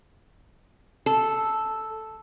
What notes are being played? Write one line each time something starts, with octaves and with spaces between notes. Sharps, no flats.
A4